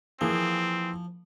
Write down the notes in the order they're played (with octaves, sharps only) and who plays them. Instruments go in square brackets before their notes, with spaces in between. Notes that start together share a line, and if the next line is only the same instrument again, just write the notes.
[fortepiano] E3 A#3 G#4 [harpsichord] F3 [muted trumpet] C4